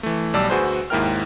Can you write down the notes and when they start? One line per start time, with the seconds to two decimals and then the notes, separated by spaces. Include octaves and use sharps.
0.03 E3 A3
0.34 B1 G3 D5 A5 E6
0.50 D2 F#4 G#4 B4 C5
0.90 D#2 G#2 E4 A#4 G5 F6